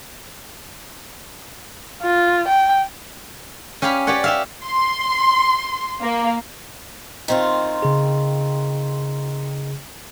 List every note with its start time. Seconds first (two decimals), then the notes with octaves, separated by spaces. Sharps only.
2.02 F4
2.48 G5
3.82 C#4 G4 F5 G#5 B5
4.07 G4 B4 C#5 D5 F#5
4.24 G4 E5 F5
4.65 C6
6.01 A#3
7.28 D#3 C4 F4
7.82 C#3 G#4